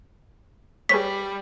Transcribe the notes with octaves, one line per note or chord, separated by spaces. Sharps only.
G3 G#4 B4 C#5 B6